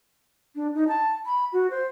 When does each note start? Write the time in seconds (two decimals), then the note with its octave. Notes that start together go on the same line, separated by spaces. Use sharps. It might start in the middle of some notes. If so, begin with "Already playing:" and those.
0.56 D4
0.75 D#4
0.88 A5
1.26 B5
1.53 F#4
1.71 C5